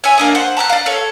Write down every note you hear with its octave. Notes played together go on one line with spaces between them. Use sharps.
C#5 E5 G#5
A#3 D4 D#5
C5 F#5
A5 A#5 E6 F#6
D5 F5
A4 C#5